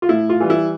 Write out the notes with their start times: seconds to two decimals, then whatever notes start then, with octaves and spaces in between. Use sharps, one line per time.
0.02 F4
0.09 A2 E4
0.29 F4
0.40 E3 G3
0.50 E4